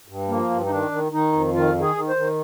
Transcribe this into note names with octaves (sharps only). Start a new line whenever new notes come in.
G2
F3 A#3
G2
D#4
D#3 D4
D#3
D#3 D#4
F2
D#3 F4
D#3
G#4
D#3
C5
D#3